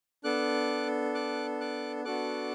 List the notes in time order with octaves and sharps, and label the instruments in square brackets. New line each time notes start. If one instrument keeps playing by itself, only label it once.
[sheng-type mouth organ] B3 D4 A4 D6 F#6
D6 F#6
D6 F#6
B3 D4 F#4 A4 D6 F#6